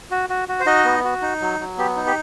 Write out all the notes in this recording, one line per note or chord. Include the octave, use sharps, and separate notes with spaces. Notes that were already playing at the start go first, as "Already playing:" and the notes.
F#4
F#4
F#4
C5
D#4 F#4 D#5
B3
F#4
D#4
F#3
F#3
B3 G4
D#4
G4